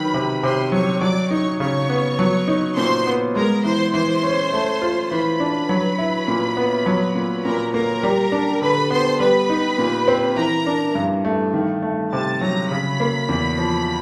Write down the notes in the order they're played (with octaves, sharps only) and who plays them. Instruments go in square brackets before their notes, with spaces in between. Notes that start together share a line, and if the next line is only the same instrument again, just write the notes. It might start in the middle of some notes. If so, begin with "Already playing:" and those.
Already playing: [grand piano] D#3 F#3 [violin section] B4 B5
[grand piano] C3
[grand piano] C3 [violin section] C5 C6
[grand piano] F#3 [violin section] C#5 C#6
[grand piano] F#3 [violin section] D5 D6
[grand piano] D#4 [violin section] C#5 C#6
[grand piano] C#3 [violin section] C#5 C#6
[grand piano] B3
F#3
D#4
[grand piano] A#2 [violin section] C5 C6
[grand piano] B3
[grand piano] G#3 [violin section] A#4 A#5
[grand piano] E3 [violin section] C5 C6
[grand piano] E3 [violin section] C5 C6
[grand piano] C#4
A3
F4
[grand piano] E3 [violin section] B4 B5
[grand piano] D4
F#3
E4
A#2
B3
F#3
A#2
[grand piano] A#2 [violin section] A#4 A#5
[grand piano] A#3 [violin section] A#4 A#5
[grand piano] G3
D4
[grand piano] D3 [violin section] B4 B5
[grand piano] B3 [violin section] C5 C6
[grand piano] G3 [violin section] B4 B5
[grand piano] D#4
A#2
C4
[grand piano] E3 [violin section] A#4 A#5
[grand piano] D4
G2
A3
D#3
A3
[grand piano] C3 [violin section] A5 A6
[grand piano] F#3 [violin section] A#5 A#6
[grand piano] C#3 [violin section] B5 B6
[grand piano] A#3
E2
F3